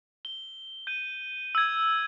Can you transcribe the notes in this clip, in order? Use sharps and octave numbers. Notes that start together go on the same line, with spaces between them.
G7
G6 D#7
E6 G#6